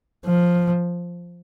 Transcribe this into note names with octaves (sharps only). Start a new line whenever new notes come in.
F3